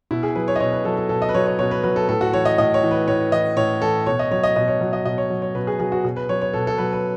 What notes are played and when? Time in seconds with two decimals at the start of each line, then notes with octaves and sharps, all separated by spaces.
0.11 B2 E4
0.23 G#4
0.35 F#3 B4
0.48 C#5
0.56 D#5
0.60 B2 C#5
0.72 B4
0.85 F#3 A4
0.97 A4
1.09 B2 A4
1.22 D#5
1.29 B4
1.34 F#3 C#5
1.47 C#5
1.59 B2 C#5
1.71 B4
1.83 F#3 B4
1.96 A4
2.09 A2 A4
2.21 F#4
2.33 E3 C#5
2.45 D#5
2.58 A2 D#5
2.74 C#5
2.83 E3
2.91 B4
3.07 A2 C#5
3.32 E3 D#5
3.57 A2 C#5
3.82 E3 A4
4.06 B2 C#5
4.19 D#5
4.31 F#3 C#5
4.43 D#5
4.56 B2 D#5
4.68 C#5
4.81 F#3
4.93 D#5
5.06 B2 D#5
5.18 C#5
5.30 F#3
5.42 C#5
5.55 B2 B4
5.67 G#4
5.80 F#3 G#4
5.92 F#4
6.04 B2 G#4
6.17 B4
6.29 F#3 C#5
6.41 C#5
6.53 B2 A4
6.67 A4
6.78 F#3 B4
6.93 B4